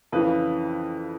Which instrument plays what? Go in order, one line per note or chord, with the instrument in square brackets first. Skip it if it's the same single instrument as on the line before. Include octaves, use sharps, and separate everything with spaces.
[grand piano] F2 C#3 E3 B4